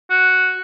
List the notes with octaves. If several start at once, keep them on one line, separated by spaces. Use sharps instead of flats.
F#4